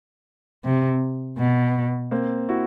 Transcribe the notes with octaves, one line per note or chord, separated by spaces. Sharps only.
C3
B2
A#3 C4
E4 F#4